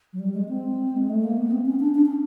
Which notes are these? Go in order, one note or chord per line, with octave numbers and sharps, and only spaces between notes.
F#3
G3
G#3
C4
G#3
A3
A#3
B3
C4
C#4
D4
D4
C#4